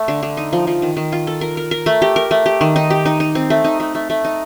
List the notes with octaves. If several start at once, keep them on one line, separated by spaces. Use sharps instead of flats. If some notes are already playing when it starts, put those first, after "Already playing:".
Already playing: A3
D3
D3
D#4
F3
F3
D#3
D#3
F4
A4
A#4
A#4
A#4
A3
G4
A#4
A3
G4
D#3
D#4
G4
D#4
D#4
C4
A3
D#4
A3
A3
A3
D#4